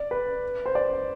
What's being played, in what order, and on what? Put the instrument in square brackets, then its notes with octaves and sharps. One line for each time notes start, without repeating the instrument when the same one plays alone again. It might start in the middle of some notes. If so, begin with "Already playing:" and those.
Already playing: [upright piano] D5
B4
C5
D5